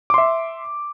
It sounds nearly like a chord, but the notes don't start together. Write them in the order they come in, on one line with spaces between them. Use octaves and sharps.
D6 C6 E5